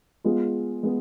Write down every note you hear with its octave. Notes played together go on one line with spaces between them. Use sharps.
G#3 B3 F4
G#3 B3